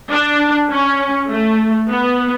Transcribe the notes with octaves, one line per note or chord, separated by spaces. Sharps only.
D4
C#4
A3
B3